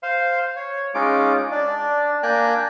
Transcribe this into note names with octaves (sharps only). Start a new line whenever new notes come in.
C5 F5 C6
C#5
G#3 C#4 D#4 F4 D6
D4 D5
A#3 D4 G5 G#5 A#5 F#6